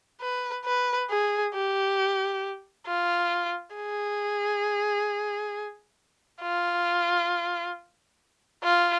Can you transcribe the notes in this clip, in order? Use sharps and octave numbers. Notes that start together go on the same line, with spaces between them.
B4
B4
G#4
G4
F4
G#4
F4
F4